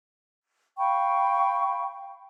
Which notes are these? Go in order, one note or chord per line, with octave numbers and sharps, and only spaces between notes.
F5 G5 B5 C#6